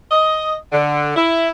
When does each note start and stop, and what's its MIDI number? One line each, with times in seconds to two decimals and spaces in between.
0.12 0.55 75
0.73 1.14 50
1.16 1.49 64